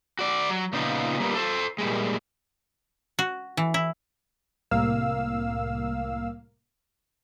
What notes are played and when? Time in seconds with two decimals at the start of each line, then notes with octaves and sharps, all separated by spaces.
0.19 F#4 D5
0.50 F#3
0.73 A#2 C#3 B3 D#4 F4
1.20 G3 A#3 B3
1.34 A4 C5
1.78 A#2 G3 G#3
3.19 F#4
3.57 E3
3.74 E4
4.71 C2 A2 A#3 F5 E6